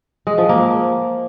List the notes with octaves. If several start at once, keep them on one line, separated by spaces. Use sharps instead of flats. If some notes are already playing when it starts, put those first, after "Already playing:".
G#3
F3
A#3